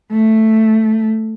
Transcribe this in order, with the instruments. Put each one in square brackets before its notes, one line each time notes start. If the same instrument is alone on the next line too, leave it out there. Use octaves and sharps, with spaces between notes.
[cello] A3